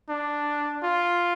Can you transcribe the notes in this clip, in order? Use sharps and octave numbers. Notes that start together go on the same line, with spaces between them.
D4
F4